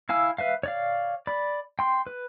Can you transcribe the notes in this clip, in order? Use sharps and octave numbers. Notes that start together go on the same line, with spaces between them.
E4 F5 G#5 E6
B4 E5 F5
C#5 D5 F5
D5 B5
G5 C6
B4